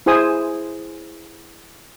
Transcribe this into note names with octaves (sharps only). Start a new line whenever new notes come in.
E4 G#4 C5 G#5 D#6